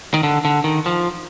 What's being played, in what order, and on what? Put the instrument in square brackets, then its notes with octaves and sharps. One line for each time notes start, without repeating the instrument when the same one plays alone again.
[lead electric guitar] D#3
D3
D3
D#3
F3